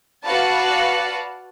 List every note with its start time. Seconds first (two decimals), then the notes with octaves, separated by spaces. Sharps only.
0.22 F#4 B4 D5 F5 A5